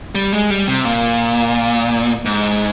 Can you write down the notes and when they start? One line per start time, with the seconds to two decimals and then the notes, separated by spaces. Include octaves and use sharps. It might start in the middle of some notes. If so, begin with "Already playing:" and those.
0.15 G3
0.32 G#3
0.50 G3
0.68 C3
0.85 A#2
2.25 G#2